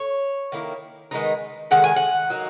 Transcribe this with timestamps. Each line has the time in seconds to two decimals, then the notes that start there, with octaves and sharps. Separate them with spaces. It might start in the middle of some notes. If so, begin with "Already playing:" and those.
Already playing: C#5
0.52 D#3 A#3 E4
1.11 D#3 G#3 B3 D#4
1.71 D#3 G#3 F#5
1.84 G#5
1.96 F#5
2.30 F#3 A#3 D#4